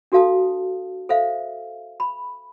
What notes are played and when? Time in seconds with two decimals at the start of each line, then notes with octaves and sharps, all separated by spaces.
0.12 D4 F#4 A4 F5 A5 D#6
1.09 A4 C5 E5 F5
2.00 B5